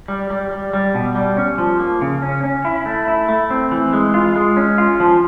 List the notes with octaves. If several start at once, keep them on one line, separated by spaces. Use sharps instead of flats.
G3
G3
G3
G3
B2
G3
C#4
F3
A#3
C#3
C#4
C#4
E4
A3
E4
A3
C4
E3
G#3
F4
G#3
C#4
F4
F3